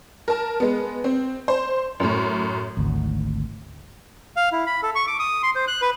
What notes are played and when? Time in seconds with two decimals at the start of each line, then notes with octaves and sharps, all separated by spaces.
0.28 A#4 A5
0.60 G#3 B3
1.04 C4
1.48 C5
2.00 F#2 A2
2.77 G#1 D2
4.36 F5
4.52 E4
4.67 B5
4.83 A4
4.95 C#6
5.07 D6
5.19 D#6
5.43 C6
5.55 C5
5.68 F#6
5.82 B4